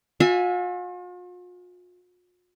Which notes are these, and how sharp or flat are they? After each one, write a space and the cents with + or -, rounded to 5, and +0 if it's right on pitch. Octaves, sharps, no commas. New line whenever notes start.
F4 +45 E5 +0 G#5 +0